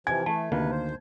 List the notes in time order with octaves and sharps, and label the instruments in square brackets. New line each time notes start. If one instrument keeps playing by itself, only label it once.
[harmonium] C3 E3 F3 [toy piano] G#5 [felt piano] G#6
[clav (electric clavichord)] E3 [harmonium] A3 [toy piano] A5
[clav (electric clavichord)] D2 D#3 [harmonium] C3 B4 [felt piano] A#3
[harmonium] C5